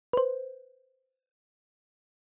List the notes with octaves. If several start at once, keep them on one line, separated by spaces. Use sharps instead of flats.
B4 C5